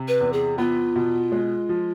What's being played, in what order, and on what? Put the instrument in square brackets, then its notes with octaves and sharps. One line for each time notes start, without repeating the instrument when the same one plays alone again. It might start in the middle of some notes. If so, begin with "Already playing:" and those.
Already playing: [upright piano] C3
[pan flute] B4
[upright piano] E2
[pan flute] G#4
[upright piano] B3 [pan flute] F4
[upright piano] B2
G#3
F3